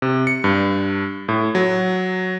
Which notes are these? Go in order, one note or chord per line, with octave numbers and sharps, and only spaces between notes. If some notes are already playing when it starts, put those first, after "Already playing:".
C3
C#7
G2
A2
F#3